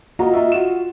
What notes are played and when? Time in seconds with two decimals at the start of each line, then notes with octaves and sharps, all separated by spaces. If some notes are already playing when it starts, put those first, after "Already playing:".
0.19 A#3 F4 F#4 D#5 A#5
0.33 F4 D#5 E5
0.52 F4 F#4 E7